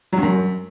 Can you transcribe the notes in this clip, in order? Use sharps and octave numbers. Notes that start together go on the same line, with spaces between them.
F#3
G2
F#2